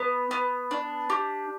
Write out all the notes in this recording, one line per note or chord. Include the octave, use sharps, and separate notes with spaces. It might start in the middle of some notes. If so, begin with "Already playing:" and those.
Already playing: B3
B3
D4
G4